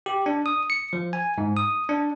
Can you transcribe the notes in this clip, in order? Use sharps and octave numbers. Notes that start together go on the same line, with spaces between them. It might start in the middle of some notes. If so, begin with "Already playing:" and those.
G4
D4
D#6
C#7
F3
G#5
G#2
D#6
D4